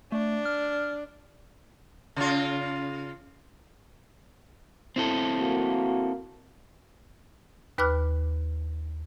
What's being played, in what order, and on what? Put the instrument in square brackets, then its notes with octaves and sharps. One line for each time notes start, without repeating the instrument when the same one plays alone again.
[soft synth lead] A3 [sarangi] D4
[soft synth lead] F6
[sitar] C#3 F4
[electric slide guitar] C4 E4 A4
[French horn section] A#3 F#4
[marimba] D#2 B4 B5 D6 F6 F#6